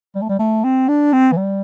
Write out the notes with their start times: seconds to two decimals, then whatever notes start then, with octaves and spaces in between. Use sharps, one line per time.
0.15 G3
0.22 A3
0.29 G3
0.39 A3
0.64 C4
0.88 D4
1.13 C4
1.32 E3
1.37 G3